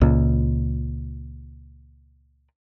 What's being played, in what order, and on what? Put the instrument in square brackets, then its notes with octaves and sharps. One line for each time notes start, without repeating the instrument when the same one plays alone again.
[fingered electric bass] C#2 A#2